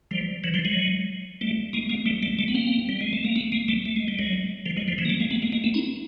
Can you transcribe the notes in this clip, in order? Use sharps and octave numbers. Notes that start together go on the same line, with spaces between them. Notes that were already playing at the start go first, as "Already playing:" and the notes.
F3 G3
E3 F#3
F3 G3
F#3 G#3
G3 A3
G#3 A#3
G#3 A#3
G3 A3
G3 A3
G3 A3
B3
A#3 C4
G3
G#3
A3
A#3
A3 B3
G#3 A#3
G3 A3
A3
G#3
G3
F#3 G#3
F3 G3
F#3 G#3
F3 G3
E3 F#3
A#3
G3 A3
G#3 A#3
A3 B3
G#3 A#3
G#3 A#3
A3 B3
C#4 D#4